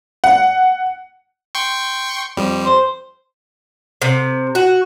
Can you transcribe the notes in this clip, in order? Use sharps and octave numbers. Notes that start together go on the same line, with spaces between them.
F#5
G5 C6 C#6
F2 G3
C5
C3
F#4